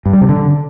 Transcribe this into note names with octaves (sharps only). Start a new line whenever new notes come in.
G2
G3
C3
D3